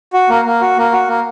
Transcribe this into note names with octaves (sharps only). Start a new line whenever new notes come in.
F#4
A#3
A#3
F#4
A#3
F#4
A#3